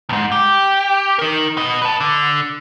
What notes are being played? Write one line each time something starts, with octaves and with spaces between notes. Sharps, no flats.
D2 G#2
G4
D#4 A#4
B3 D#5
B4 A5
D3